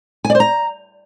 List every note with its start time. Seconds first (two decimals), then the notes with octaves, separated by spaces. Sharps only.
0.25 G#5
0.30 D5
0.35 C5
0.40 A#5